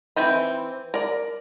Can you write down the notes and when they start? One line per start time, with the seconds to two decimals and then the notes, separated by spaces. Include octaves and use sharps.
0.16 E3 C4 G5 B5
0.94 A#4 D5